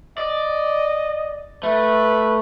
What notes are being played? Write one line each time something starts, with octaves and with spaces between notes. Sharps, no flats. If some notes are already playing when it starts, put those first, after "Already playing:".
D5 D#5
A3 B4